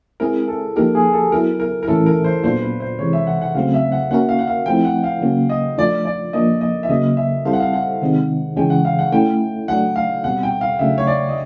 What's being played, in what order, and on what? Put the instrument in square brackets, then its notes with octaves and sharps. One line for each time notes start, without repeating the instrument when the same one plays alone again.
[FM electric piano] G#3 C4 E4 G#4 [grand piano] A#4
[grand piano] A4
[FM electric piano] F3 A#3 D#4 G4 [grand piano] A#4
[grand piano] G#4
A4
[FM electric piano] F#3 B3 E4 [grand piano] A#4
[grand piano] A#4
A#4
[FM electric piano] A2 E3 A3 C#4 E4 [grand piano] A4
[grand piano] A#4
C5
[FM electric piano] A#2 F#3 B3 D4 F4 [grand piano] C5
[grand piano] B4
C5
[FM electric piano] C3 E3 G#3 [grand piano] C#5
[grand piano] E5
F#5
F#5
[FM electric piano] C#3 F#3 A3 C4 [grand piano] F5
[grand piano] E5
F#5
[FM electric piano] A#3 C#4 F#4 A#4 [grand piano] F#5
[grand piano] F5
F#5
F5
[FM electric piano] F3 A3 C4 E4 [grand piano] G5
[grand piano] F#5
F5
[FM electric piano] C#3 F#3 A#3 C#4
[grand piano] D#5
[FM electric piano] F3 A3 D4 F4 [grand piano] D5
[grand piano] D5
[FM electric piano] F3 A#3 D4 [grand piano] D#5
[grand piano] D#5
E5
[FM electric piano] C#3 F#3 A#3 [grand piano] D#5
[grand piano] E5
[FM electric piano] G3 C4 E4 A4 C5 [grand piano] F5
[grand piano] F#5
F5
F#5
[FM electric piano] C3 D#3 G#3 C4 D#4
[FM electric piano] C#3 E3 G#3 C#4 [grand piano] G5
[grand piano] F#5
F5
F#5
[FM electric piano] A3 C#4 E4 [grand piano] G5
[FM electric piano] F#3 A3 D4 [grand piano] F#5
[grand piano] F5
[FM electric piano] B2 G3 C4 [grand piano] F#5
[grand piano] G5
F5
[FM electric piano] C#3 F#3 A3 D4 [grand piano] E5
[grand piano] C#5
D5
D#5